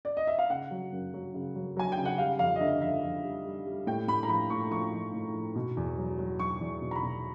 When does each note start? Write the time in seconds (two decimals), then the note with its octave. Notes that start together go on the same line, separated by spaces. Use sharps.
0.05 D5
0.17 D#5
0.27 E5
0.39 F5
0.50 C#3 F#5
0.71 F#3
0.93 F#2
1.14 F#3
1.34 C#3
1.55 F#3
1.77 F#3 G#5
1.92 G5
1.97 C#3
2.05 F#5
2.18 G3 F5
2.39 F2 F5
2.56 D#5
2.61 D3 E5
2.82 F2 E5
3.03 F2
3.24 G3
3.45 G3
3.66 G3
3.87 A2 G5
4.08 A2 B5
4.23 A#5
4.29 F3 B5
4.50 A2 C#6
4.71 F3 C#6
4.92 F3
5.13 A2
5.34 F3
5.55 B2
5.77 E2
5.97 F#3
6.19 F#3
6.39 F#3 C#6
6.61 E2
6.82 B2
6.91 A#5
6.96 B5
7.03 B2